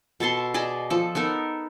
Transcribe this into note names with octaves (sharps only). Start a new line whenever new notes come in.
B2 A4 A5 C6
G#4 D5 D#5 A5
F3 A4
B3 D#4 A4 A#4